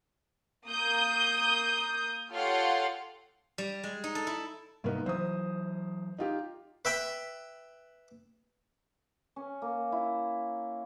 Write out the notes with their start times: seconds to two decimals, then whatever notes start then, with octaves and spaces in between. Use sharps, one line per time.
0.67 A#3 D#6 G6
2.33 F4 G4 A4 C#5 F5 F#5
3.58 G3
3.84 G#3
4.04 D#4
4.15 A4
4.27 E4
4.84 G#2 C3 G3 A#3 B3 D#4
5.06 E3 F#3 C5 D#6
6.18 D#4 F4 G4
6.85 B4 E5 G5 B5
9.36 C#4
9.62 A#3
9.92 E4